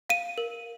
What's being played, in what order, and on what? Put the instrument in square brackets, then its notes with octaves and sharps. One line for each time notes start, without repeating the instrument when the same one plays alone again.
[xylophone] F5 D#7
A#4